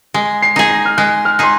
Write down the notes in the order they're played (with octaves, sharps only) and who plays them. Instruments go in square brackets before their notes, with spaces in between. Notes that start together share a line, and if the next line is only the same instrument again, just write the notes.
[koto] G#3
[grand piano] C7
[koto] D#4 G#4
[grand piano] A#6
F6
[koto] G#3 [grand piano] F#6
[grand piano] F6
[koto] D#4 G#4 [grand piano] C6